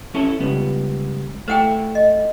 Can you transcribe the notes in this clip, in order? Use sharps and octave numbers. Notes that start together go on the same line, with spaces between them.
C#4 E4 A4
C#2 G3 B3
A3 E4 C5 F#5 G5
D#5